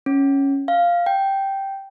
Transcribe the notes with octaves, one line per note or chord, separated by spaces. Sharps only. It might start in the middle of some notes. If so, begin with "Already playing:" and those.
C#4
F5
G5